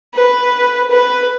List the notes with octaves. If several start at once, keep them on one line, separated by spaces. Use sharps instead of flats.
B4
B4